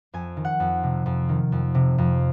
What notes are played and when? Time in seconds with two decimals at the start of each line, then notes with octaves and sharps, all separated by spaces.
0.14 F2 G#5
0.37 D#3
0.45 F#5
0.60 F2
0.83 C3
1.06 F2
1.29 D#3
1.52 F2
1.75 C3
1.98 F2